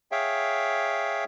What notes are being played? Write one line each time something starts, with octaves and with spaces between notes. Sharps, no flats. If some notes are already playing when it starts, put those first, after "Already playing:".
G#4 C#5 E5 F5 G5